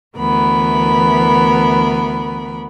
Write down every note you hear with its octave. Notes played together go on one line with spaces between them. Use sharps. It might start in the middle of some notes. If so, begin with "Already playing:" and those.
D2 E3 B3 A#4 B5